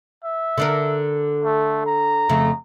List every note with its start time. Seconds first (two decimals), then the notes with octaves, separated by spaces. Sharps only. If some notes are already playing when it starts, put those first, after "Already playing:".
0.24 E5
0.58 D3 D4 A#4
1.44 A3
1.86 A#5
2.29 F2 C#3 A3